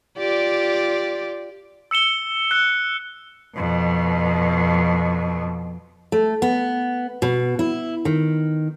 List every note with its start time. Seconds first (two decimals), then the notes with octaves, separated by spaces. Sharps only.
0.18 F4 G4 D5
1.91 E6 C#7 E7 G7
2.51 F#6 C#7
3.56 F2 B2
6.12 A3
6.42 B3
7.22 B2
7.59 E4
8.05 D#3